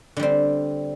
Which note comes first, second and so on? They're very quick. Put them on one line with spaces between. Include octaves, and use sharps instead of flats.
D3 G3 C4